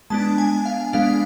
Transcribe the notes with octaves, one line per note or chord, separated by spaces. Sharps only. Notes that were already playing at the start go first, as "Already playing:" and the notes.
G#3 B3 D4 A5
G#5
F5
G#3 B3 D4 F5